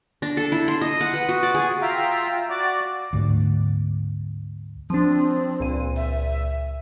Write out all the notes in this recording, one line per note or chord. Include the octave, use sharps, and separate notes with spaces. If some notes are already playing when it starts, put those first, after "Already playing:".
D4
A4
E4
C6
D#5
F#5
B4
F#4
D5
G#4
F4 E5 F5 G5 A#5
F#4 D5 D6
D2 G#2 A3
F3 C4 D4
C#2 A#2 D#7
E5